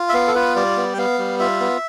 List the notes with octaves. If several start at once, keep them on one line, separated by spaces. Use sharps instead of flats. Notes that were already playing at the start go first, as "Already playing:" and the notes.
Already playing: F4
E5
B3 F5
A4
F4 B4
G3 D5
B3
G5
B3 F5
G3
F4 E5
B3